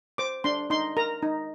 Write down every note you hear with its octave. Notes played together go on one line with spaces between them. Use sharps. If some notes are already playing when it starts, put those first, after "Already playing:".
C5 D6
D4 C6
D#4 C6
A#4 A#5
D#4